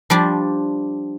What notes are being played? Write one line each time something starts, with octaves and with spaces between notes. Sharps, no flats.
F3 G3 D4